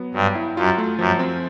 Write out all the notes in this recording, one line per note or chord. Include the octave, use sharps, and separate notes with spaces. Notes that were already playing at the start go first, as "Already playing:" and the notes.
Already playing: F#3 B3
G2 F#3
E4
F#2 F4
A3
F#2 F3
C4